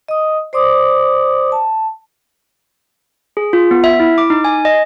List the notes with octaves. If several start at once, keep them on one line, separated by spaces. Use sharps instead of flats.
D#5 D#6
C5 D5 C6 D6 D#6
A5
G#4
F4
B3
E5
E4
D6
D#4
G#5
D#5